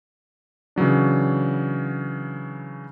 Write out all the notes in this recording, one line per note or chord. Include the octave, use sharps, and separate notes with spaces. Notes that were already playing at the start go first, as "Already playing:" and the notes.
C#3 E3 F#3 D4